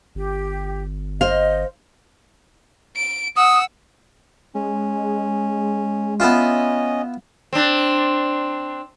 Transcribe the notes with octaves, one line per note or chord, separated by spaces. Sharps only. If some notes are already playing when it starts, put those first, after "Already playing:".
G1 G4
C5 D#5 F5
D7
F#5 D#6 E6
G#3 C#4
B3 C#4 E4 F4 D#5
C4 D4